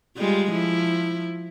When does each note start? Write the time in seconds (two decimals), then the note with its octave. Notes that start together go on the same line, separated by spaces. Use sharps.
0.18 G3 G#3 F4
0.51 F3 E4